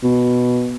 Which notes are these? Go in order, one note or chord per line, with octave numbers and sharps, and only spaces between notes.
B2